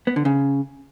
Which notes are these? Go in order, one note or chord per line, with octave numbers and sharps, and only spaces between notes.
B3
D3
C#3